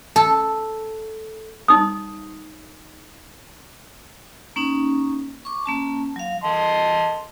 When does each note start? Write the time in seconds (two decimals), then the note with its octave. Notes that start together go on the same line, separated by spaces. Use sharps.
0.16 A4
1.68 D#4 D#6
4.56 A#3 C#4 D#4
5.45 C#6 D6
5.66 A#3 C#4 A5
6.16 F#3 F5
6.44 D#5 A5 C6